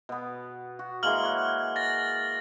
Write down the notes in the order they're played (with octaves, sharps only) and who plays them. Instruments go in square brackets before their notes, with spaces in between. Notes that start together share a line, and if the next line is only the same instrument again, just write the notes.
[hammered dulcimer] B2 B3
F#4
[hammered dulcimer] E3 G#3 A#3 [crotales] F6 F#7
[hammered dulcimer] C#5 F#5
[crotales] A6 A#6